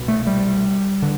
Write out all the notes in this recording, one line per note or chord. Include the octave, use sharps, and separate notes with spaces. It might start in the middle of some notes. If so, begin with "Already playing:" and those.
Already playing: C2 B2
A3
G3
D3